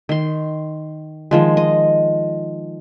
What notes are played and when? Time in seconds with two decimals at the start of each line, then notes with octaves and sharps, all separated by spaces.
0.09 D#3 C6
1.31 D#3 F3 G#3
1.57 D#5